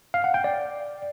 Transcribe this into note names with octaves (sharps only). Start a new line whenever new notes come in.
F5
F#5
G5
D5